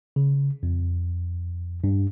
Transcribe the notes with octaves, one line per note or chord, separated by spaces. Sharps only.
C#3
F2
G2